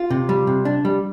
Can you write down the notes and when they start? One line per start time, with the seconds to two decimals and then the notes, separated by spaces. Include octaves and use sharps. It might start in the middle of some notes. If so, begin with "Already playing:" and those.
Already playing: F4
0.10 C3
0.29 G3
0.47 C3
0.65 D4
0.85 G3